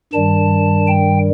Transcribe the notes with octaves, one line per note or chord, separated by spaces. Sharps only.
G2 D#3 G3 A5
G5